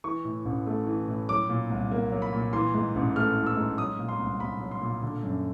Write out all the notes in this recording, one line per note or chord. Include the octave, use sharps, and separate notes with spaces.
E3 C#6
A2
A1
A3
E3
A2
F#3 D6
A#2
C2
A#3
F#3
B5
A#2
E3 C6
G#2
A1
A3 F6
E3
E6
G#2
F#3 D#6
A#2
C6
C2
C2 B5
F#3
C6
A#2
D3
F#2